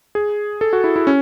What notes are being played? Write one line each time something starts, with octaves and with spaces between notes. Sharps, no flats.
G#4
A4
F#4
E4
E4
C#4